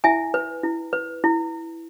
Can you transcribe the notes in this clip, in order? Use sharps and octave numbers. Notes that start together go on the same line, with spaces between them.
E4 E5 G#5
B4
E4
B4
E4